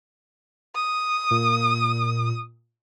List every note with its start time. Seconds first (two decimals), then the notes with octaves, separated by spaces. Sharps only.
0.75 D#6
1.31 A#2